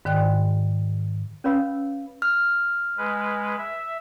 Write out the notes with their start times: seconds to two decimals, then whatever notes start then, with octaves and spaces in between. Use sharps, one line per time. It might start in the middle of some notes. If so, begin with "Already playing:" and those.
0.05 G#2 D#3 D5 G5 F#6
1.44 C#4 B4 C#5 F5 B5 E6
2.22 F6
2.98 G#3 B4
3.58 E5